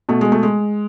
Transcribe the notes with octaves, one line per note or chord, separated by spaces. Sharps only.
B2 A3
G#3
A3
G#3